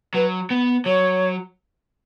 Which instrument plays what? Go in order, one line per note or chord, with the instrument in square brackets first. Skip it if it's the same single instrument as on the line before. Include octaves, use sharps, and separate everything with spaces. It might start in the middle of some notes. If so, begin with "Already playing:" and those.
[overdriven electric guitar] F#3 [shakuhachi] B4
[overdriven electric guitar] B3
[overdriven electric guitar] F#3 [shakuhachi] C#5